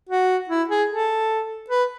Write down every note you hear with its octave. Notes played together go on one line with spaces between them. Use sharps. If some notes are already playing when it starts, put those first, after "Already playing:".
F#4
E4
G#4
A4
B4